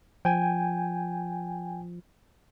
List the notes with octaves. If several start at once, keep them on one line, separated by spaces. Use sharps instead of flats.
F3 G5 G#5